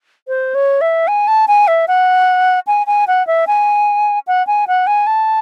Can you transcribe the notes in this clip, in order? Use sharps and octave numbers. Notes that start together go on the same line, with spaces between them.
C5
C#5
E5
G#5
A5
G#5
E5
F#5
G#5
G#5
F#5
E5
G#5
F#5
G#5
F#5
G#5
A5